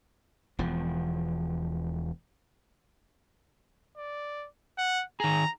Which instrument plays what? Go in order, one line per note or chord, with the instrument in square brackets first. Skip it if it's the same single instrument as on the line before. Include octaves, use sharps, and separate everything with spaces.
[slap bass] E1 E2 F3
[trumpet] D5
F#5
[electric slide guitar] D#3 G#4 [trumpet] A#5